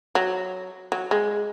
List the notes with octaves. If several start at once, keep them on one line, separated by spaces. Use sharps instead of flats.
F#3
F#3
G#3